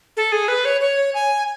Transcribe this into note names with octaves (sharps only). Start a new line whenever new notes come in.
A4
G#4
B4
C#5
C#5
G#5